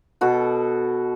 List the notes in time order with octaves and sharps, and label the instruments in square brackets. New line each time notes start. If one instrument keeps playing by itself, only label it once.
[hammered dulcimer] B2 F#4 A4